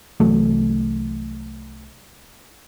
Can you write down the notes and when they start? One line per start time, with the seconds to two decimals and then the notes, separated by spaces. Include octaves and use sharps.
0.20 C2 E3 F#3 A3